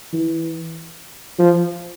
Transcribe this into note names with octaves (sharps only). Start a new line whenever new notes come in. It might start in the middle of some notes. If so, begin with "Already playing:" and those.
E3
F3